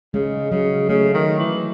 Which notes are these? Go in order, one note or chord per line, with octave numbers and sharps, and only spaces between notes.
C#3 G#3
C#3 F#3
C#3 A3
D#3
E3